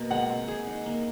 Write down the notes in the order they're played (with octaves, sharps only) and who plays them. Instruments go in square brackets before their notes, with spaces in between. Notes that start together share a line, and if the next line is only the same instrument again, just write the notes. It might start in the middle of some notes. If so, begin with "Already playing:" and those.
Already playing: [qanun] B2 A#3
[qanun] G#3 [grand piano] F#5
[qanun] C4
G#4
D#4
A#3